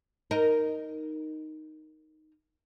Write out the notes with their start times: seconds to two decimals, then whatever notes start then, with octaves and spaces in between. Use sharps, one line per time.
0.31 D#4 A#4